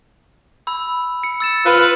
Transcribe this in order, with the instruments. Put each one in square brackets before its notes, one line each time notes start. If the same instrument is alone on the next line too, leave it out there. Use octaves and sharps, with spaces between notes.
[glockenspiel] B5 E6
C#7
E6 A6 E7
[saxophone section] F4 B4